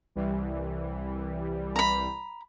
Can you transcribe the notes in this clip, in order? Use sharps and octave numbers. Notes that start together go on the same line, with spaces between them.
C2 E3 G3
A#5 B5